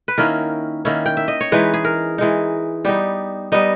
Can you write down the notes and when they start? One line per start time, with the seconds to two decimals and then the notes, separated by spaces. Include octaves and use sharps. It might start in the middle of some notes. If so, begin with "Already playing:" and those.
0.08 B4
0.18 D#3 A#3 C#4 E4 A#4
0.85 D#3 A#3 C#4 E4
1.06 G5
1.17 E5
1.28 D#5
1.41 C#5
1.52 E3 G#3 D#4 B4
1.74 G#4
1.85 A#4
2.18 E3 G#3 D#4
2.85 G3 B3 D#4 G4
3.52 G3 B3 D#4 D#5